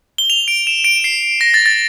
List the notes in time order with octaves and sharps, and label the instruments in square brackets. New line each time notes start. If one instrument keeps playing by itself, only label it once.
[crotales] G7
F7
D7
E7
D7
C7
A#6
A6
A6